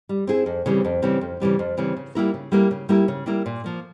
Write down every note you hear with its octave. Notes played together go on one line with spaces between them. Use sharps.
G3
C4 E4 G#4
F2
C#3 E3 G3 C4
F2
C#3 E3 G3 C4
F2
C#3 E3 G3 C4
F2
C#3 E3 G3 C4
C#3
G3 A#3 E4 A#4
C#3
G3 A#3 E4 A#4
C#3
G3 A#3 E4 A#4
C#3
G3 A#3 E4 A#4
A#2
F3 A#3